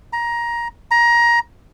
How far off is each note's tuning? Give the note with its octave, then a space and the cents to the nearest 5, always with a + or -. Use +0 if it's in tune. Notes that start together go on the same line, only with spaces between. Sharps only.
A#5 +15
A#5 +20